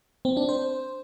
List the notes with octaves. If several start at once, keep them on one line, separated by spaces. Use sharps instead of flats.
C4
D4
C5